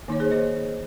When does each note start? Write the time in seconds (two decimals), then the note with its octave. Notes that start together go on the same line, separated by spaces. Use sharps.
0.08 D#3 A#3 D#4 C#5
0.20 G#4 C5
0.31 C5 D#5